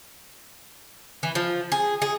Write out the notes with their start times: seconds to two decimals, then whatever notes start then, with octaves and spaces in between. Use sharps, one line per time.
1.23 E3
1.35 F3
1.72 G#4
2.02 G#4